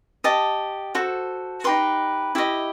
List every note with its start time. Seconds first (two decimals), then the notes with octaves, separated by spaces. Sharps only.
0.24 G4 D#5 A5
0.95 F#4 A4 C5
1.64 D#4 G4 B4 C6
2.35 E4 G4 B4 D#5